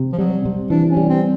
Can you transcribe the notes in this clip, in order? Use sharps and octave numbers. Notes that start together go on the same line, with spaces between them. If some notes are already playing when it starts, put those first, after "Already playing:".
Already playing: C3
F3
F#3 G3
C3
E3 D4
C#4
G3
C4